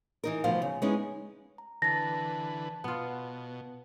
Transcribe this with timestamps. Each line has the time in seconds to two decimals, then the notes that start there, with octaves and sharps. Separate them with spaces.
0.24 E3 D#4 A#4
0.44 D2 B2 F3 F5
0.62 C#3
0.82 G#3 B3 C#4 D#4 E4
1.58 A#5
1.82 D3 E3 B4 A5 A6 A#6
2.84 B2 B3 F4